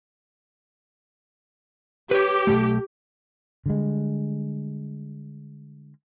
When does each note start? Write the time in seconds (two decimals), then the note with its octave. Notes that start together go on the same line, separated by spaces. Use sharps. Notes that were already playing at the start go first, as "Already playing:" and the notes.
2.11 G4 B4 C#5
2.47 B1 G#2 A3
3.66 D3 G3 G#3